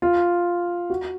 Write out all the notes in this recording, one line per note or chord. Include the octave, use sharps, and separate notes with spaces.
F4
F#4